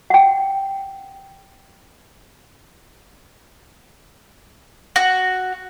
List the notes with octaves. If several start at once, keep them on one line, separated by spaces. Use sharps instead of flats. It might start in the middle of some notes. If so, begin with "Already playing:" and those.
F#5 G5
F#4